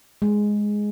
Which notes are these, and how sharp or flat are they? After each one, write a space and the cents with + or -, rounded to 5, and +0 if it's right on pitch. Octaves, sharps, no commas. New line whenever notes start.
G#3 +0